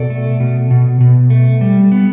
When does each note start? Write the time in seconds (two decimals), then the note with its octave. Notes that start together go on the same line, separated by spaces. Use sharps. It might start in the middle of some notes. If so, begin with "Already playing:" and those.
Already playing: B2 A4 D5
0.10 A3
0.40 B2
0.71 B2
1.00 B2
1.30 A3
1.61 G3
1.92 B3